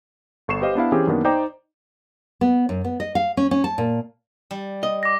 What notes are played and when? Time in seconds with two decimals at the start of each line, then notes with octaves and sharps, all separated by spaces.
0.48 G1 A4 C#6 C7 E7
0.62 G4 B4 C5 D#5 F5
0.75 B3 D4 E4 F5
0.92 E3 C4 C#4 G4 G#4
1.07 F#2 D#3 A#3 B3 D4
1.25 D#4 C5 D5 G5 A#5 D6
2.41 B3
2.69 F#2
2.84 B3
3.00 D#5
3.15 F5
3.37 C#4
3.51 C#4
3.64 A5
3.78 A#2
4.51 G3
4.83 D#5
5.03 D6 A#6